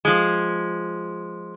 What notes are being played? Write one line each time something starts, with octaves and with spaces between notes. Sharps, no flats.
F3 G#3